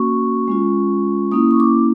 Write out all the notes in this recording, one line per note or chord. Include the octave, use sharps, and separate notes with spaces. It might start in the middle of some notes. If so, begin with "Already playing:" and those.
Already playing: A#3 C#4 F#4 C#6
G#3 C#4 F4
A#3 C#4 E4 D#6
C#6
D6